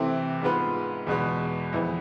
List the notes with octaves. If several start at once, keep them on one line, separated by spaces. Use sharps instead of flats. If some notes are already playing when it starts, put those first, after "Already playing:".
Already playing: C3 E3 A3 C4
G#2 G#3 B3 F4 B4
E2 B2 G#3 B3
F2 E3 B3